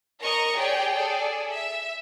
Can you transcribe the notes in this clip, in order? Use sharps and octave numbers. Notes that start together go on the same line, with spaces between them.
A#4 D#5 A#5 C#6
G4 G#4 C#5 D5 G5
G#4 A4 D5
E5